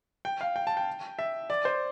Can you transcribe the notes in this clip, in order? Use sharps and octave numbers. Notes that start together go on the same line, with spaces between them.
G5
F5
G5
A5
G5
E5
D5
C5